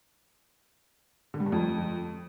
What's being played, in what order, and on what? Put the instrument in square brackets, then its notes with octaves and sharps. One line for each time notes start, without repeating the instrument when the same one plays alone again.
[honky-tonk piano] D3
G3
G2
F2